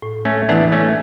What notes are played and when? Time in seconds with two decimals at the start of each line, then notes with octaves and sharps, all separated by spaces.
0.02 A2
0.25 A3 C#4
0.49 E3 A3 B3 D4 E4
0.72 A3 C#4